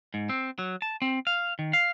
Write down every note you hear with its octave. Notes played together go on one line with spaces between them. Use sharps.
G#2
C4
F#3
A5
C4
F5
D#3
F5